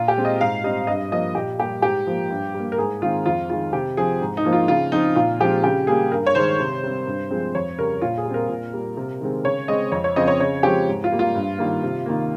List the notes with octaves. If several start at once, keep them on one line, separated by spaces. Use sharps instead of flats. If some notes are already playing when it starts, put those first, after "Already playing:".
Already playing: A#2 F4
G4
G#3 C4
D#5
G#2 F5
G3 C4 D#5
G2 D#5
F3 A#3 D#5
A#2 G4
G3 A#3 G4
G#2 G4
F3 A#3
G2
G3 A#3
A#4
G#2 G#4
D#3 G#3 C4 F4
F2 F4
D#3 G#3 F4
C3 G4
F3 C4 G#4
G#2
D#4
F3 A#3
F4
C#3 F4
F3 C4 D#4
A#2 F4
F3 G#3 C4 G4
C#3 G4
G3 A#3 G#4
G2 A#4
C#5
D#3 G#3 C5
C3
G3 C4
G2
F3 G#3 C4
F2 C#5
C#3 G3 A#4
A#2 F4
G#4
G3
C4 A#4
A#2
G3 A#3
C3
D#3 G#3 C4
C#3 C#5
G#3 C4 D#5
F2 C#5
C#5
C#3 F3 C4 D#5
C#5
C#3 C#5
F3 G#3 C4 G4
G#2
F4
G3 A#3
F4
G2
D#3 G3 A#3
C3
D#3 A#3